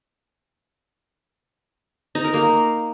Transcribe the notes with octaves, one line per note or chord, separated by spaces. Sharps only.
D#4
A#4
A#3